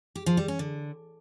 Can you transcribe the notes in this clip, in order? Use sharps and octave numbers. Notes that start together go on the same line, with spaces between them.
G4
F3
G3
C#4
D3